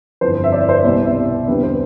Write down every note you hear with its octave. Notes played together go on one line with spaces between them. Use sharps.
G1 F2 E3 C5
E5
D5
C5
C2 B2 G3 B3 D5
E5
E2 D3 G3 C4 B4
C5